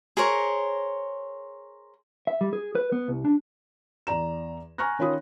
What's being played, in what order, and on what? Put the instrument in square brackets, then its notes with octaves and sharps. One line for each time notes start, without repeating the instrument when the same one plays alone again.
[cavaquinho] G#4 A#4 C5 C#5
[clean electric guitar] E5
G3
G#4
B4
B3
C2
D4
[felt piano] E2 D5 A#5 E7
G#5 A#5 C#6 F6 F#6 A#6
D#3 C#4 F4 B5 D#6